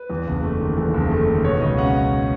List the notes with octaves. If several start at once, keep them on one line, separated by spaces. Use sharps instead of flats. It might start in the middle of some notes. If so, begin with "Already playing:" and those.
Already playing: B4
E2
F#1
A3
D#3
E2 A4
F#1
A3 A4
D#3
B2 C#5
C#2 D#5
C#4 F#5